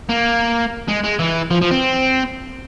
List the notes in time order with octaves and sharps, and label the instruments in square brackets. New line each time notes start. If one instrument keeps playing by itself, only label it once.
[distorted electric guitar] A#3
G#3
G#3
E3
F3
F3
C4